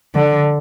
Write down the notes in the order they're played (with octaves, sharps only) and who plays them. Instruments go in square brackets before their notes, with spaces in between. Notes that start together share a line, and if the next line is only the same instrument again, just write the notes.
[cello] D3